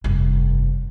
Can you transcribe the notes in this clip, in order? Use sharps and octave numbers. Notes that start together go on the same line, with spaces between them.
F1 G2